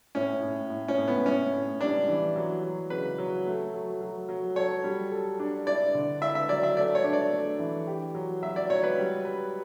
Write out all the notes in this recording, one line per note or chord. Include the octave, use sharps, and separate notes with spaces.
A2 C#4
A2
A2
C#4
A2
B3
A2 C#4
A2
G3 D4
E3
F#3
F#3
C#3 B4
F#3
A3
F#3
F#3
F#3
A4 C#5
G3
A4
D4
E4 D5
D3
E4 E5
E5
F#3 D5
E5
A3 D5
C#5
D4
D5
A3
E3
G4
F#3
F#3 E5
D5
F#3 C#5
B4
G3
B4